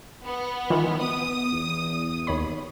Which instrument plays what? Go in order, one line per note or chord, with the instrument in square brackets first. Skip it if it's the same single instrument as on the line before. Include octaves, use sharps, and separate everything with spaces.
[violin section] B3
[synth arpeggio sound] D#3 E3 F4
[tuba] B3 [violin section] D#6
[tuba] E2
[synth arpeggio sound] D#2 C#5 B5